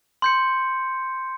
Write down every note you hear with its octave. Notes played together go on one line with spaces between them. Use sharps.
C6 G6 C#7